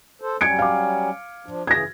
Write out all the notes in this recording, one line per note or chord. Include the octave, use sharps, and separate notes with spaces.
A4 C5
F#3 G3 C#4 G#6 C#7 D7
F5 D6
F3 D4
C#3 E3 G#4 G#6 A#6